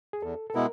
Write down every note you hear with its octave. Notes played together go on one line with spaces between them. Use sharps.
G#4
E2 A4
A4
B2 G#3 B3 E4 A#4